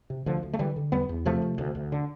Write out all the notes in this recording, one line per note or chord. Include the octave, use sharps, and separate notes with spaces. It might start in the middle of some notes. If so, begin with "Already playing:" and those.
C3
D2 D3 F3
D2
A3
D3 E3 G3
D3
E2 G3 B3
E2
C3 F3 A3
C3
D2
D2
D3